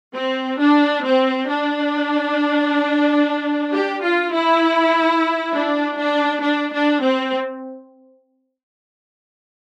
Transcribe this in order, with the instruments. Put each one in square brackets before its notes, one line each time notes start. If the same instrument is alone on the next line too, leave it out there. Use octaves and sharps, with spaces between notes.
[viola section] C4
D4
C4
D4
G4
F4
E4
D4
D4
D4
D4
C4